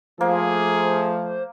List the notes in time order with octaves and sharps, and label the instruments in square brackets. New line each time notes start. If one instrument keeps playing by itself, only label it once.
[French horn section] F3 A3 [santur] A#3 [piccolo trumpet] G#4 [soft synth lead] C5